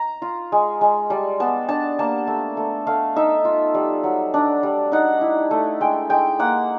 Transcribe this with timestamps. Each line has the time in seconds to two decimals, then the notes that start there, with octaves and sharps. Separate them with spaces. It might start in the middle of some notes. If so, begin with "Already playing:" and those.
Already playing: A#5
0.22 F4
0.52 G#3
0.81 G#3
1.10 G3 A5
1.40 B3 A5
1.69 D4 A5
1.99 A#3 A5
2.27 A3
2.57 A3
2.87 A3 F5
3.16 D#4 E5
3.45 F4
3.74 G3
4.04 F#3
4.34 D4
4.63 G3
4.92 D#4 F#5
5.21 E4
5.51 A3
5.81 G#3 G5
6.10 G#3 G5
6.39 A#3 F#5